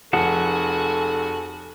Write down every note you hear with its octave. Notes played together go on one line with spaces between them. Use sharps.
F1 F#4 G#4 A4 F#5 G#5 A5